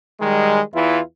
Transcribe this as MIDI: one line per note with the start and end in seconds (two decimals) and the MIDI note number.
0.21 0.60 51
0.21 0.60 55
0.21 0.60 56
0.73 0.99 40
0.73 0.99 52
0.73 0.99 64
0.73 0.99 65